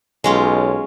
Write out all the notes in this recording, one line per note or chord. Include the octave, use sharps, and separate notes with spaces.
B1 G#3 C#4 F4